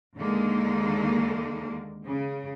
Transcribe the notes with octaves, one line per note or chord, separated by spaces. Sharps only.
D#2 D3 G#3 A#3
C#3